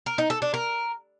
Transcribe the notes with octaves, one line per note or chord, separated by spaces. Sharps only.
A#4
D#4
A4
D4
A#4